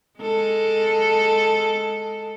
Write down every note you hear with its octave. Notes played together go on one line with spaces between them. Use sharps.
G#3 A4